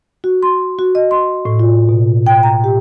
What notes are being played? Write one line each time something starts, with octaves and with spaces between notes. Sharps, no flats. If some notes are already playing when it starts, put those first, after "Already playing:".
F#4
C6
F#4
D#5
C6
A2
F4
B2
G5
A#5
G4